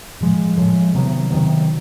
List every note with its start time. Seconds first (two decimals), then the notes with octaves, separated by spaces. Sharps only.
0.20 A2 F3 G#3
0.57 A2 F3 G#3
0.94 C3 D#3 F#3 B3
1.31 C3 D#3 F#3 B3